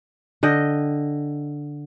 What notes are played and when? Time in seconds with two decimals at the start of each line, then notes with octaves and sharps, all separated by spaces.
0.43 D3 D#5 G5